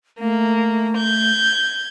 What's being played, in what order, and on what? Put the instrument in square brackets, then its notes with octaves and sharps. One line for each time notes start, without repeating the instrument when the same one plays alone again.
[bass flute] A3 [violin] A#3
[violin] G6 G#6